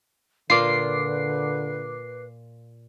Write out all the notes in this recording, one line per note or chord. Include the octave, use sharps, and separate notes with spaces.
A#2 D3 F4 B4 D6 C7